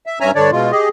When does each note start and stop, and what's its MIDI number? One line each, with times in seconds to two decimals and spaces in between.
0.06 0.19 76
0.20 0.31 43
0.20 0.31 61
0.20 0.31 76
0.20 0.31 80
0.20 0.31 82
0.35 0.51 43
0.35 0.51 50
0.35 0.51 62
0.35 0.51 73
0.35 0.51 74
0.52 0.72 47
0.52 0.72 56
0.52 0.72 65
0.72 0.89 67
0.72 0.89 68
0.72 0.89 75